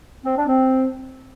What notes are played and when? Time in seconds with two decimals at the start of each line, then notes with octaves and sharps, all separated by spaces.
0.25 C4
0.36 D4
0.47 C4